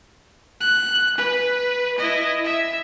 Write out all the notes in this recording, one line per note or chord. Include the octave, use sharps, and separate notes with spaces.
F#6
B4
E4 D#5
E5